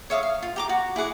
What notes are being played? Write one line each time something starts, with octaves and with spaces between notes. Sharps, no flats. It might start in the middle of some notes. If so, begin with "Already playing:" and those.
C#5 E5 F5 D#6
F5
F4
G4 A#5 D6
F#4
E4 G#4 F#5 D6